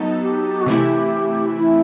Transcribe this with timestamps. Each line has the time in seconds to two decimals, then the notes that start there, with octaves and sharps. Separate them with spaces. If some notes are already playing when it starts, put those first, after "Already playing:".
Already playing: F#3 B3 D#4 A4
0.21 G4
0.61 F#4
0.67 C3 E3 A3 E4 G4
1.58 E4